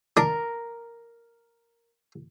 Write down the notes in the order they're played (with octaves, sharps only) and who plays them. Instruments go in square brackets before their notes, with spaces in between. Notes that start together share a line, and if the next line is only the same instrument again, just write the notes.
[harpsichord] D4 [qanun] A#4